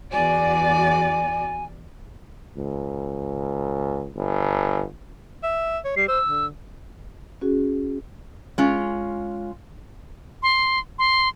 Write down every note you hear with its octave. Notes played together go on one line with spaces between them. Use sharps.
E2 F#4 D5 G#5
C#2
G1
E5
C#5
G3 C7
C5 E6
D3
C#4 F#4 G#4
G#3 C#4 F4
C6
C6